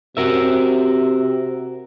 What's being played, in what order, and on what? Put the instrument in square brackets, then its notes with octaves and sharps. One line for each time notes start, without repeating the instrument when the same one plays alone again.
[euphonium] C3 [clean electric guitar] F#4 A#4 E5